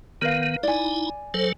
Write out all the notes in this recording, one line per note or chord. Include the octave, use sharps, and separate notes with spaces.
D#3 B3 A#4 B4 F5
D#4 E4 D5 G#5
F#3 A4 C5